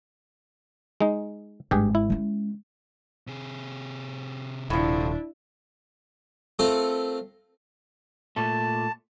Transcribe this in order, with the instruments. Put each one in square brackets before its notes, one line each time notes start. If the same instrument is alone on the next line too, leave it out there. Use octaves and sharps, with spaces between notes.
[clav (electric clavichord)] G#3 D#4
[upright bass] G#1 [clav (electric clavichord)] G2 G4 G#4
[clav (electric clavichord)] E4
[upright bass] G#3 C#4
[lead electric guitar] C3 G#4
[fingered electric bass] D#1 [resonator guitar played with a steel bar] A2 F3 [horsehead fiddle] D4 E4
[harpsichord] A3 C4 F4 A4 A#4
[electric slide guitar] A#2 A3 [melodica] A5